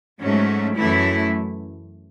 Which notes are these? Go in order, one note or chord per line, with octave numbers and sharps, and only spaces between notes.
G#2 F#3 A3 C#4
F#2 E3 A3 E4